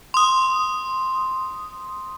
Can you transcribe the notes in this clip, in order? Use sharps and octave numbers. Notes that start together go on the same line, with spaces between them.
C6 D#6